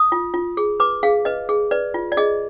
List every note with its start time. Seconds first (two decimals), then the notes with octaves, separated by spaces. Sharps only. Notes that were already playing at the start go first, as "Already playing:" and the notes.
Already playing: D#6
0.12 F4
0.34 F4
0.57 G#4
0.80 B4 D6
1.03 G#4 F5
1.25 B4 D#5
1.49 G#4
1.71 B4 D5
1.94 F4
2.12 D5
2.17 G#4 D#5